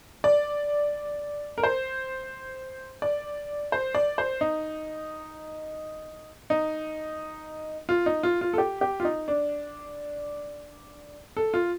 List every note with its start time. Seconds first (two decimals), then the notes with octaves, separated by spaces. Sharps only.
0.24 D5
1.58 A#4
1.63 C5
3.02 D5
3.72 C5
3.95 D5
4.18 C5
4.41 D#4
6.50 D#4
7.89 F4
8.06 D#4
8.23 F4
8.41 F4
8.53 A4
8.58 G4
8.81 G4
9.00 F4
9.05 D#4
9.28 D4
11.37 A4
11.54 F4